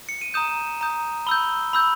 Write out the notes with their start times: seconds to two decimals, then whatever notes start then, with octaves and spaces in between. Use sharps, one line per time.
0.09 C#7
0.21 D#7
0.34 A#5 D#6 G6 E7
0.81 A#5 D#6 G6
1.27 B5 E6 G6 G7
1.73 B5 E6 G6